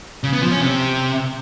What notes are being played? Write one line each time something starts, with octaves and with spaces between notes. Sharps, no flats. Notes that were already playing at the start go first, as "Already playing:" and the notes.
C#3
B3
F3
C#4
C3